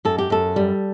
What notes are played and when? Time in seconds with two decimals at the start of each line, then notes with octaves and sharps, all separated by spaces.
0.05 F#2 A4
0.18 G4
0.30 F#2 A4
0.56 G3